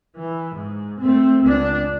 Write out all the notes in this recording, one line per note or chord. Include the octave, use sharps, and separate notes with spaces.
E3
G#2
A3 C4
C#2 D4